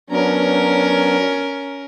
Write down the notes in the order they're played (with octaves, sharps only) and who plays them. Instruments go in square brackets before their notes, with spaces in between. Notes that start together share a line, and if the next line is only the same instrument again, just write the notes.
[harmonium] F#3 B3 D4 [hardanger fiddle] C#4 A#4